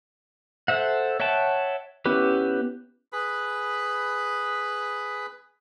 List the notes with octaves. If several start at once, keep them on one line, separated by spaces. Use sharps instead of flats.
A4 C5 E5 F#5
C#5 E5 F#5 G5 A5
B3 C#4 E4 G4 B4
G#4 B4 B5